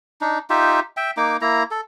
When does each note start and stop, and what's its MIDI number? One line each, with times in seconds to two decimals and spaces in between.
0.21 0.39 62
0.21 0.39 63
0.50 0.80 63
0.50 0.80 65
0.50 0.80 67
0.50 0.80 76
0.97 1.11 76
0.97 1.11 79
1.17 1.37 58
1.17 1.37 63
1.17 1.37 86
1.41 1.63 58
1.41 1.63 64
1.41 1.63 82
1.71 1.81 69